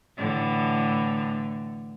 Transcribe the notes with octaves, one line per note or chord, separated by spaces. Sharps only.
A2 D3 E3